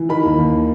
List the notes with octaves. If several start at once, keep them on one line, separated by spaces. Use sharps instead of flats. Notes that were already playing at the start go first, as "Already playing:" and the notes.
Already playing: E3
D#3 B5
D#2
D#2